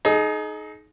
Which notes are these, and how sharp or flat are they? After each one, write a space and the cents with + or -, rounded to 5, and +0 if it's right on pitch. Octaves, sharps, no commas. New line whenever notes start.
D#4 +0 G#4 +40